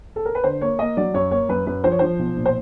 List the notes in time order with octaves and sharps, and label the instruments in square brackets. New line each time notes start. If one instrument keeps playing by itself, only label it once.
[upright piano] A4
A#4
B4
D3 C5
A#3 C#5
A#3 D#5
F#3 D5
F#2 C#5
A#3 C#5
F#2 B4
F#2 B4
F3 C5
C#5
F3 C5
B1
A#2
C5